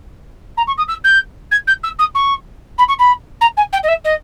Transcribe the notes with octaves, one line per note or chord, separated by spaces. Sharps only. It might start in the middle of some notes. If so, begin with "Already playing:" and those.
A#5
C#6
D#6
E6
G6
G#6
G6
E6
D#6
C#6
B5
C#6
B5
A#5
G#5
G5
D#5
E5
D#5